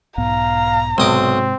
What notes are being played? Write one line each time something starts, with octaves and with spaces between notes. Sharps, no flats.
B1 G#2 B3 F5 A#5
B1 G#2 C3 G#3 C4 D#5 D6